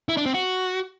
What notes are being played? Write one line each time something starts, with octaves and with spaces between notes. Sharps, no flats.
E4
D4
C4
F#4